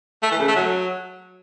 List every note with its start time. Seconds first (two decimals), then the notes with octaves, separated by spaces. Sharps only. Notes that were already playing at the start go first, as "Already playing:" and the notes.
0.23 A3
0.31 E3
0.39 C#3
0.48 A3
0.56 F#3